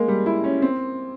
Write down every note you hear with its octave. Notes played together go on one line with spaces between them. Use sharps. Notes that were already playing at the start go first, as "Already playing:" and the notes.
Already playing: G#3 A#3
G3
E4
C#4
C4